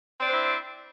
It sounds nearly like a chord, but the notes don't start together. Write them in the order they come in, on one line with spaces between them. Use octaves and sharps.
C4 D5 D4 C5 E4